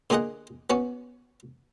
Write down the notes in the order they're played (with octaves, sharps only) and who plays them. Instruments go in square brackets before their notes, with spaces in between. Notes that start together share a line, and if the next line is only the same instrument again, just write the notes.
[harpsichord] D3 A#3 F4 G#4 D#5 F#5
B3 C#4 F#4